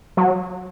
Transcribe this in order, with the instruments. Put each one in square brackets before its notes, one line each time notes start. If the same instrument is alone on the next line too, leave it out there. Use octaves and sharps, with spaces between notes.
[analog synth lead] F#3